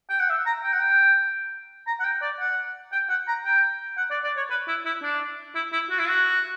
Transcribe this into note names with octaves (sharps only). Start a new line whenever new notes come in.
G5
F#5
E5
A#5
G5
F#5
G5
A#5
F#5
G5
D5
F#5
G5
F#5
A#5
G5
F#5
D5
D5
C#5
B4
E4
E4
D4
E4
E4
F#4
E4
F#4